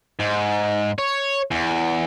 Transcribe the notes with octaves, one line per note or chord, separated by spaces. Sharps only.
G#2
C#5
E2